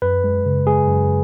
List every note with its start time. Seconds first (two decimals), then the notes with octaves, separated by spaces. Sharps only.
0.02 F#2 B4
0.24 G#3
0.46 C#3
0.67 G#3 G#4
0.88 F#2